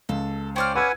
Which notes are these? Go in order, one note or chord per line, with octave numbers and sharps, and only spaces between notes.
C#2 A4
C#4 C5 D5 G5 F6
B4 F#5 G#5 E6 G#6